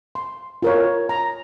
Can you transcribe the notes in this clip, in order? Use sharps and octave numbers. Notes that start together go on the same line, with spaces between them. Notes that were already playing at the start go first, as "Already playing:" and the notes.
C6
F4 A#4 C#5
A#5